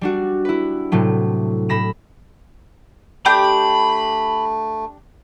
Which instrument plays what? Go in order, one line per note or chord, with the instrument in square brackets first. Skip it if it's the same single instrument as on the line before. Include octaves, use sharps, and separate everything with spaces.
[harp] G3 D4 F#4
E4 B4
A2 C3 F#3 A3
A2 B5 A#6 E7
[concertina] A3 [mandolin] D4 G4 G6 [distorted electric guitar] B5